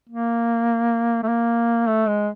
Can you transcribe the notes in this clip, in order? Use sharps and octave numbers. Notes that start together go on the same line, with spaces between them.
A#3
A3
A#3
A3
G#3